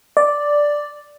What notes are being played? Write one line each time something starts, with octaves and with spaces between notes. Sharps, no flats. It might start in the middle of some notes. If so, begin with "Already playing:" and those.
D5